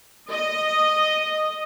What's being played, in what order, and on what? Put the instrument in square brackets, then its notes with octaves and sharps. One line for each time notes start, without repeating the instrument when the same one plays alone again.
[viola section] D#5